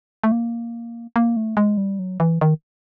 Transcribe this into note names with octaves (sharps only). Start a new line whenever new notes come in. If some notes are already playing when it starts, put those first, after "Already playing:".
A3
A#3
A#3
A3
G#3
G3
F#3
E3
D#3